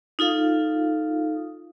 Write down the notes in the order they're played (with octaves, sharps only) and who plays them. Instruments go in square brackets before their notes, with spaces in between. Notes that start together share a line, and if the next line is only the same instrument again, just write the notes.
[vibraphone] D#4 F4 A4 F5